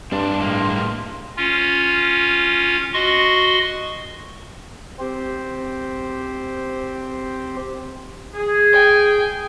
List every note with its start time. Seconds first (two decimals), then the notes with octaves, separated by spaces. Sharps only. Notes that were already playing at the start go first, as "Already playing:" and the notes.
0.12 G2 C4 D5 A5 C6
0.40 A2 G#3 A#3
1.37 C#4 F4
2.94 F#4 D#5 C6 C#6
4.99 C4 G4 C5
8.35 G#4
8.73 G5 G#5